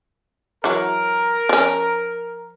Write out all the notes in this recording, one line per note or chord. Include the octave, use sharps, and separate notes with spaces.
E3 F#3 A#4
F3 C#4